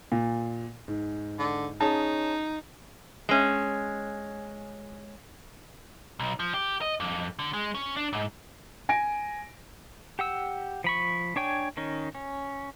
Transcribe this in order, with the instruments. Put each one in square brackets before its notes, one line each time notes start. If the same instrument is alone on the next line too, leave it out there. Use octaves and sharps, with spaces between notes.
[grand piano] A#2
G#2
[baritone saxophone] D3
[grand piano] C#4 G#4 A5 [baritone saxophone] D#4
[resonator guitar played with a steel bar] G#3 C#4
[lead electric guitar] B1
F3
G4
D#5
F2
D3
G#3
C#4
D4
G#2
[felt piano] G#5 A#6 D7
[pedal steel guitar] G4 F#5 E6
F3 B5 C#6
D4 C#5 G5 G#5
D#3 C#4 D#4
C#4